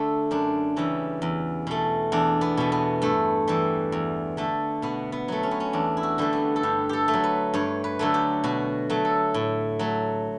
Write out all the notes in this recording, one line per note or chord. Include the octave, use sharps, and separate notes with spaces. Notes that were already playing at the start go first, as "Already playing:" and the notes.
Already playing: D3 A3 D4
F#2 D4
C#3 E3 G3
E2
B2 A3
E2 D4
B3
B2 A3
B3
G2 A3
E3 G3
E2
D3 A3
B2 B3
B3
F#3 A3
C#4
B3
C#4
E2 D4
E4
F#4
D3 G3 A3
B3
A4
G2 G4
G4 A4
A3
F#3
B4
G2 C#5
B4
D3 F#3 A3
G4
B2 F#4
F#3 A3
A4
A2
F#3 A3